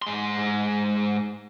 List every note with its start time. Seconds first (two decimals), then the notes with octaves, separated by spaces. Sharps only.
0.02 G#2 C6